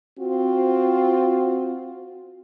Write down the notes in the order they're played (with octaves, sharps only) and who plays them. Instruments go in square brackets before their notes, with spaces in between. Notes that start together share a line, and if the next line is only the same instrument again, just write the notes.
[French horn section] C4 F4 F#4